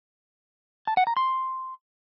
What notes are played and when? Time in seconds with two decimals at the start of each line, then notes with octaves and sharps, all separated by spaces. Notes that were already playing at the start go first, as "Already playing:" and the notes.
0.87 A5
0.97 F#5
1.07 A#5
1.17 C6